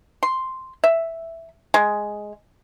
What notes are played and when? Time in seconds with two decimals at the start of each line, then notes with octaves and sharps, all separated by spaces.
0.23 C6
0.84 E5
1.74 G#3